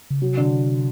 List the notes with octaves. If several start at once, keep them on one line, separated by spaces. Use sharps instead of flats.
C#3
C3 F#3
D3